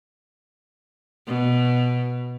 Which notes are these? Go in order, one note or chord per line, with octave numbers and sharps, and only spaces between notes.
B2